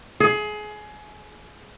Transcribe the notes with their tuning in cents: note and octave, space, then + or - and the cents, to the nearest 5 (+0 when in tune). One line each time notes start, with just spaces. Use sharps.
G#4 +25